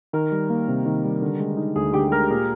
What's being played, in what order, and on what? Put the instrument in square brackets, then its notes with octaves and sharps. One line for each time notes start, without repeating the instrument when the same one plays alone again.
[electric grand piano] D#3 [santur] A#4
[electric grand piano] G3
A#3
C3
D#3
G3
D3
G#3
D#4
[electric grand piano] D2 [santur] G#4
[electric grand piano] D3 [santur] G4
[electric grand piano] G#3 [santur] A#4
[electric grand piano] A#2 [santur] G#4